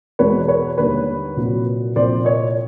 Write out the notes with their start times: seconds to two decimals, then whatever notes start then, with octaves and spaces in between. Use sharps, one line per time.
0.19 E2 B2 G#3 B4 C#5
0.48 B4 C#5
0.77 D#2 D3 G3 A#3 B4 C#5
1.37 C2 A#2 F#3
1.96 C2 A#2 F3 A#3 C5 D5
2.25 C#5 D#5